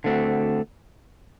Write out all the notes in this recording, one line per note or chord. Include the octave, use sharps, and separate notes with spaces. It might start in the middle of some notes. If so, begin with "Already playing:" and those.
D3 A3 C4 F#4